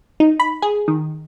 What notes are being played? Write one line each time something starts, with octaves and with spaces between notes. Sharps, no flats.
D#4
B5
G#4
D#3